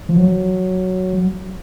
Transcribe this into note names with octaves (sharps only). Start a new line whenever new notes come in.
F3
F#3